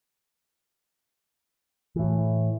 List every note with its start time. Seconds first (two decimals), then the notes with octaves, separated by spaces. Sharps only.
1.96 A2 E3